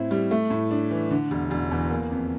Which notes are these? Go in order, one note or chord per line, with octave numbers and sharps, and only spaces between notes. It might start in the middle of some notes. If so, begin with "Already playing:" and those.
Already playing: A2 C4 E4
G3
A3
A2
D4
E3
D3
E1
E1
E2
A#3
F2